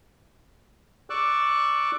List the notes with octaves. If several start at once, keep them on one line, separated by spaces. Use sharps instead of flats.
D5 C#6 D6 E6 F#6